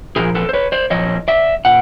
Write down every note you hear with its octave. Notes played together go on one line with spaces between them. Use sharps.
A#2 F3 G#4 A#4
A4 B4
C5
B4 C#5
C5 D5
A#2 F3 C#5 D#5
D5 E5
A#2 F#5